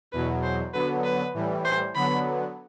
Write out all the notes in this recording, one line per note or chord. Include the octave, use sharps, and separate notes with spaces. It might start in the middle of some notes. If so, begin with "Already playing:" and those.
E2 B2 F#3 B4
C5
D3 F#3 B3 B4
B4
A2 E3 G3
C5
D3 F#3 B3 B5